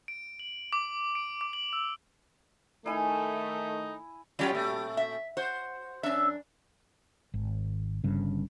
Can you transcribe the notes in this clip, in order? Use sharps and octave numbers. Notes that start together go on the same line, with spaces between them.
D7
F#7
D6
D7
D6
F#7
E6
D#3 A3 D#4 E4 G#5
F#3 G3 C#4 F4 G4 G5
A#2 A3
E5
F#4 C5
F#2 C#4 D4 E5
G#1
G1 G2 C#3